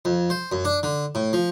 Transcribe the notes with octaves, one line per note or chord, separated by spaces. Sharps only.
F2
C5
F#2
D4
D3
A2
F3